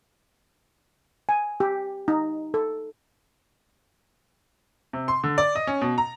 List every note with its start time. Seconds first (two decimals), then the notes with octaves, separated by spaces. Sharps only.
1.29 G#5
1.60 G4
2.08 D#4
2.54 A4
4.93 C3
5.08 C6
5.24 D3
5.38 D5
5.55 D#5
5.67 C#4
5.81 B2
5.98 A#5